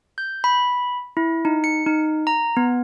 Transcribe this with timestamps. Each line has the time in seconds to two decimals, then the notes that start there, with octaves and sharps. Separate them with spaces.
0.18 G6
0.44 B5
1.17 E4
1.45 D#4
1.64 C#7
1.87 D#4
2.27 A#5
2.57 B3